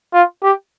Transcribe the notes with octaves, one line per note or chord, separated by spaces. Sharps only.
F4
G4